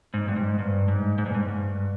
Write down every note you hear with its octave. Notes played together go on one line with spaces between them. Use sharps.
G#2
G2
G#2
G2
G#2
G#2
G2
G#2
G2